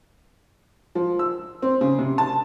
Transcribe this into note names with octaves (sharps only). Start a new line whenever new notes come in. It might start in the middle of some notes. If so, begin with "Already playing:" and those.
F3
E6
C4
C#3
C3
A5